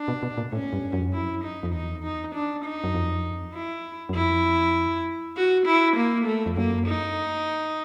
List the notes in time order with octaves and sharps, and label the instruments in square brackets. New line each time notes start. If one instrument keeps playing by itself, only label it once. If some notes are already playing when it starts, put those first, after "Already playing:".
Already playing: [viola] D4
[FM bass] B2
B2
A#2
[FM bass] A2 [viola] C#4
[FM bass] G2
F#2
F2
F#2
[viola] E4
D#4
[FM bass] F2
[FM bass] E2 [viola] D#4
[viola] D#4
D4
D#4
[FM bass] F#2
F2
[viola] E4
[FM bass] F#2
[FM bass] F2 [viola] E4
[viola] F#4
E4
A#3
A3
[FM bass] F2
[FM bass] F#2 [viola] A#3
[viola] D#4